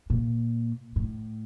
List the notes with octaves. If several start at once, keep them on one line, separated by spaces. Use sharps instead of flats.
A#2
A2